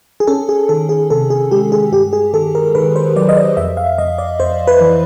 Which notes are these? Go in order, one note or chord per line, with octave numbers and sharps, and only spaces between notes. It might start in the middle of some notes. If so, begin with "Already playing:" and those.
G#4
C#4 A4
G#4
D#3 A4
G#4
C3 A4
G#4
G#3 G4
G#4
G2 G4
G#4
D#3 A4
A#4
D#3 B4
C5
F#3 D5
D#5
D5
F2 E5
F5
F2 D#5
D5
F2 C5
B4
E3